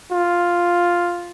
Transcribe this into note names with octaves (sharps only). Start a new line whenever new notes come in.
F4